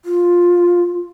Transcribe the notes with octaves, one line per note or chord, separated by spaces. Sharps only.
F4